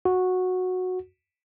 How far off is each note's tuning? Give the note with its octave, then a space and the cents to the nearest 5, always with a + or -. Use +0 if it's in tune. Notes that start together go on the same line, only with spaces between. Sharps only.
F#4 -10